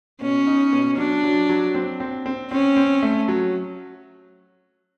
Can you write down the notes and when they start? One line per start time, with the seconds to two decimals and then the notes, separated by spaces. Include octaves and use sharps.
0.21 B2 C#4
0.47 D#4
0.72 B2
0.97 F#3 D4
1.24 F#3
1.49 F#3
1.75 C4
2.00 C4
2.26 C4
2.51 C4 C#4
2.76 C4
3.03 A3
3.28 F#3